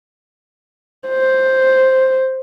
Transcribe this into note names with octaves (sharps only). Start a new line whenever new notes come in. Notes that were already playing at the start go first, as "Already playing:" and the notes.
C5